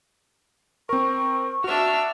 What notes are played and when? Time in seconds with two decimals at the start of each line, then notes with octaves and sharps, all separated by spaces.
0.89 C4 A#4 C#6
1.64 D4 F#4 E5 F6